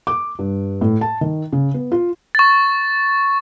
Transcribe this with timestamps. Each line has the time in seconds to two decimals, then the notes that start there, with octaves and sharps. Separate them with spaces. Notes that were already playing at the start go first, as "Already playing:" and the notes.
0.07 D6
0.39 G2
0.81 A2
1.01 A5
1.21 D#3
1.52 C#3
1.74 B3
1.92 F4
2.35 C#6 A6